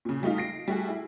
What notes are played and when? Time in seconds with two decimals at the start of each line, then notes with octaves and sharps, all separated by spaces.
0.05 A#2 C#3
0.23 G3 A3 D#4 F4
0.38 A#6 C7 D7
0.68 G3 A3 F#4 G#4
0.89 E4